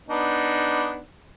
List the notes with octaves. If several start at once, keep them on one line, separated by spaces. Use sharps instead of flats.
B3 D4 D#4